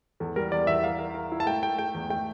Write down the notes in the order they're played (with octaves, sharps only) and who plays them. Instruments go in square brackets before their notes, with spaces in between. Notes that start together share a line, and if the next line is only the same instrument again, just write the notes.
[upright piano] E2 [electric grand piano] A4
[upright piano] G3 [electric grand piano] A#4
[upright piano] E2 [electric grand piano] D5
[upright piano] E2 [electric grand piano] E5
[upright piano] A#4 [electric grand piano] F5
[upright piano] A#4
A#4
E4
[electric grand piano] A5
[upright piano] A3 [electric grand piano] G5
[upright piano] A3 [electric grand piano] G5
[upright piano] A3 [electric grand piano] G5
[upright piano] E2
[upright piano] A3 [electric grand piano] G5